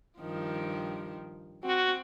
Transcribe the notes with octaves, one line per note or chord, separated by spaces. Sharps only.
G2 D#3 F3
C4 F#4